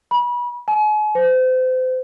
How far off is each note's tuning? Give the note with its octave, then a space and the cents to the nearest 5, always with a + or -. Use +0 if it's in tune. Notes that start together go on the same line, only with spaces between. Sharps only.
B5 -30
G#5 +40
C5 -35